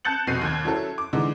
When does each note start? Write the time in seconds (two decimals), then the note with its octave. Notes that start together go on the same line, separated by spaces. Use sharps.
0.05 A5 F#6 G6 A6 C#7 F#7
0.27 F1 B2 C7 D#7
0.41 D#2 G#6
0.65 F#3 C#4 E4 A4
0.98 D6
1.13 D3 E3 G#3 D#4